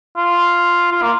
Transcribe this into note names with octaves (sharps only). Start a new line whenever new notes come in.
F4
F4
A#3